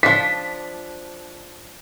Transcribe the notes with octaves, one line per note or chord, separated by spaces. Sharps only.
F3 D4 B6